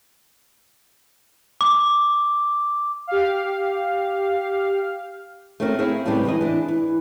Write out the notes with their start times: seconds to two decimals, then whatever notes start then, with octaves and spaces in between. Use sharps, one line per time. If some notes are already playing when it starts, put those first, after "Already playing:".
1.61 D6
3.07 G4 F5
5.60 A3 C4 C#4 F#4 A#4
5.79 A#3 C4 C#4 E4 G#4
6.05 A2 C#3 G3 B3 C4 D4
6.25 E3 G#3 B4 D#5
6.41 E3 D4
6.68 E3